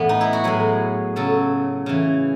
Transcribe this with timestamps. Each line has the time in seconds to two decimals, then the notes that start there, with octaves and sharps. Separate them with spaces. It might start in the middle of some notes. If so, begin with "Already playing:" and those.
Already playing: A2 E3 B3
0.09 D#4
0.21 E4
0.33 F#4
0.44 A2 F#3 G#4
1.16 C#3 F#3 A4
1.86 C#3 E3